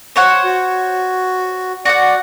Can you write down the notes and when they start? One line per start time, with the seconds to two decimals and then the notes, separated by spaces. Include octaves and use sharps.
0.16 C5 C#5 F#5
0.44 F#4
1.85 F#4 D5 F#5